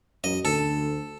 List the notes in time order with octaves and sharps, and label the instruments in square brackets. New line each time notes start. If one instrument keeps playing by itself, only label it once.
[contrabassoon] F#2 [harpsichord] D#5
[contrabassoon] D2 [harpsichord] A4